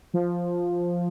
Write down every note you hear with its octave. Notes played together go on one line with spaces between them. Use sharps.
F3